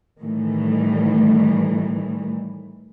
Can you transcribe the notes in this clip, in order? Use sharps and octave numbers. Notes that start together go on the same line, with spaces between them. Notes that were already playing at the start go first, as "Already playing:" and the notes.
A2 D#3 E3 G3 A3